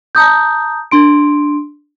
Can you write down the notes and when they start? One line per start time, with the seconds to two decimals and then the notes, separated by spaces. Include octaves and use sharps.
0.15 A5 A#5 D#6 G6
0.91 D4 C6 D7